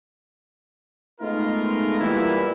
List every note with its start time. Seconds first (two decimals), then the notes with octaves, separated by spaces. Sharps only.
1.21 G#3 A3 B3 D#4 F4 A#4
2.00 A#2 E3 G3 A#3 B3 E4